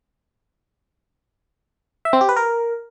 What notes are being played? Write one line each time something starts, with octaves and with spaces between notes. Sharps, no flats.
E5
C4
G4
B4
A#4